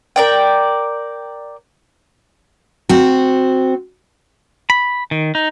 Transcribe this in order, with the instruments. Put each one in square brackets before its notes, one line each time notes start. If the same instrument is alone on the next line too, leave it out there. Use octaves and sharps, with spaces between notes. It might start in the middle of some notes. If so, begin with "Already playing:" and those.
[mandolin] A#4 D5 G5
[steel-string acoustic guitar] C4 F#4
[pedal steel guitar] B5
D#3
D#4